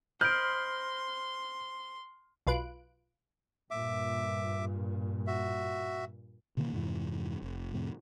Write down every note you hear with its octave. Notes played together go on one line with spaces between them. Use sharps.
C5 D#5 B5 C6 F6 G6 D7
B1 F4 B4 F#6 D7
G2 A#2 E5 D6
F#4 E5
B2 D3 D#3 A#3
F2 G#2 C3 E3
F1
F2 A2 C3